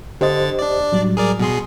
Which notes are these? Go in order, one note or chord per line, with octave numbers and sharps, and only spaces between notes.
D3 G4 C5 D#5 A6
D4 D5
A2 F#3 G3
G#4 A#4 D5
B2 G#4 C6